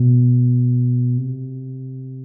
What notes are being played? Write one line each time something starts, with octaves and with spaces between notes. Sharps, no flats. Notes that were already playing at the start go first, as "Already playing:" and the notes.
Already playing: B2
C3